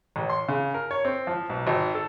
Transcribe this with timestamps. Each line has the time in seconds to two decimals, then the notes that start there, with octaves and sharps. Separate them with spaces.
0.16 A1
0.30 C6
0.49 C#3
0.74 A#4
0.91 C#5
1.05 C4
1.27 F3
1.49 B1
1.67 G#1
1.95 A4